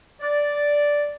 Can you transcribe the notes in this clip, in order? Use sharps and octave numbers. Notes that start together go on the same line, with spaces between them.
D5